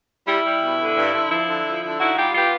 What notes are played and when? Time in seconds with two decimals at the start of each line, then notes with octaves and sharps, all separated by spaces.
0.25 G3 E4
0.43 G3
0.60 B2
0.78 D3
0.95 G2
1.13 D3
1.29 F3 E4
1.47 D3
1.65 F3
1.82 D3 E4
1.99 D#4 E4 F#4
2.17 G3 F4 G4
2.34 B3 F4 G4